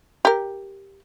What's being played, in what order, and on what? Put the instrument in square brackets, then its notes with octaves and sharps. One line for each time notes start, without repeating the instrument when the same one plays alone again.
[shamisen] G4 A#4